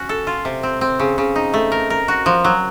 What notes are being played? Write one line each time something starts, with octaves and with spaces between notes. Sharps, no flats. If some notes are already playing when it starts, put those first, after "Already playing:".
Already playing: C#4 F#4
A4
F4
C3
C4
C4
C#3
C#3
D#4
A3
A#4
A#4
F#4
F3
F#3